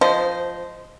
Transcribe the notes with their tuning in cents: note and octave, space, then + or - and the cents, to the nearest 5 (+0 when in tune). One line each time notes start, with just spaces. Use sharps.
F3 +0 C5 -15 D#5 +0